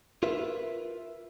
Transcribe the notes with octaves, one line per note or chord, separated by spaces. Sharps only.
F4 A#4 B4 E5